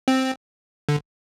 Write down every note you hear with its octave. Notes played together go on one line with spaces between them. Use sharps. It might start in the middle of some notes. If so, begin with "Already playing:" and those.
C4
D3